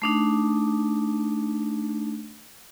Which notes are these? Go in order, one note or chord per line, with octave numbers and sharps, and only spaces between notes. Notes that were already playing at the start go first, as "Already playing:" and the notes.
A3 D4 D#4